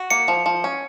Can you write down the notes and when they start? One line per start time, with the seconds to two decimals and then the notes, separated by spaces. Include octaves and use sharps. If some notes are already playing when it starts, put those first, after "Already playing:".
Already playing: F#4
0.10 A#3 C#7
0.28 F3
0.46 F3
0.64 C#4